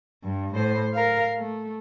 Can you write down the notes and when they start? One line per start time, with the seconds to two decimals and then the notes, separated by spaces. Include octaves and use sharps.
0.24 G2
0.55 A2 C5
0.93 A#4 F5
1.37 A3